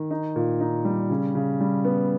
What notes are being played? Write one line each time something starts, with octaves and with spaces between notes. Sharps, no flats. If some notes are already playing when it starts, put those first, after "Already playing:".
Already playing: D#3
D#4
A#2
D#4
G3
C#3
C#3
G3
B3